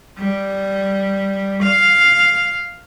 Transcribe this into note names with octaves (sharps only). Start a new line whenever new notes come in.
G3
F5